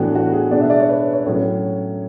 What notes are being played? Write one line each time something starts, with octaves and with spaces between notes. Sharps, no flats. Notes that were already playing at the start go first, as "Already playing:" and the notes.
Already playing: A2 E3 B3 D4 F#4
F#4
G#4
B2 G#3 B3 D4 D5
E5
D5
C#5
B4
C#5
A2 F#3 C#4